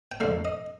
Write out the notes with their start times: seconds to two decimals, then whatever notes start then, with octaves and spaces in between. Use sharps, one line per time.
0.12 G5
0.20 F2 D3 A3 F5
0.45 D#5